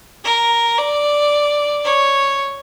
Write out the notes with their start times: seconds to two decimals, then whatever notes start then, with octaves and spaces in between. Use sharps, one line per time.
0.24 A#4
0.78 D5
1.84 C#5